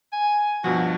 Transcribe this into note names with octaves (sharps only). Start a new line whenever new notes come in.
G#5
G2 B2 F3 F#4